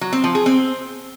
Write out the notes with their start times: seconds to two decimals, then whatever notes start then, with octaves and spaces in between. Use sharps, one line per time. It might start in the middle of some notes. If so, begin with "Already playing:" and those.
0.01 F#3
0.13 C4
0.24 F3
0.35 G#4
0.46 C4